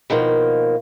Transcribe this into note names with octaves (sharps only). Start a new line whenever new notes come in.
B2 D#3 F3 A#3